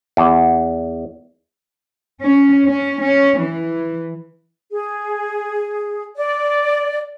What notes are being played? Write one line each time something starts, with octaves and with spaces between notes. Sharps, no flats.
E2
C#4
C#4
C#4
E3
G#4
D5